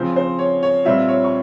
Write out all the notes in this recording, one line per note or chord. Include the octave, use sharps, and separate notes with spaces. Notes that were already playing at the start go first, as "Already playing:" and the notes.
Already playing: C#3 F3 C4 C5
C5
C#5
C#5
A#2 G3 C4 F4 E5
C#5
C#6